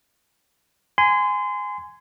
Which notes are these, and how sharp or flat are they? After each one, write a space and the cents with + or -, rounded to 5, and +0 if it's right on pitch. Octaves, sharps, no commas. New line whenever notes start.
G#5 +0 C6 -30